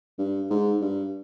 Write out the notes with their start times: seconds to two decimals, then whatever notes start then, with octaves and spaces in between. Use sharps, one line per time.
0.19 G2
0.50 G#2
0.81 G2